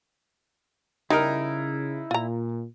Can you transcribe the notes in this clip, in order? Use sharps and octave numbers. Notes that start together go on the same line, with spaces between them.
C#3 G3 D#4 E4 A#4
A#2 F4 A#5